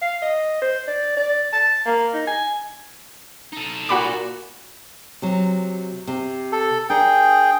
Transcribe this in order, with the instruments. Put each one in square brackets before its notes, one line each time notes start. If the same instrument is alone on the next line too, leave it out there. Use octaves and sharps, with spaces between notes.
[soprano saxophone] F5
D#5
C5
D5
D5
A5
A#3
D#4
G#5
[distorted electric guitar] D#4 A4
[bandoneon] A#2 [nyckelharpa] A#3 F#4 [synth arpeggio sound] F#5 B5 D6
[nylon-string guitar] C3 F#3
C3
[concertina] A4
[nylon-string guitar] D4 A#4 [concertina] G#4 G5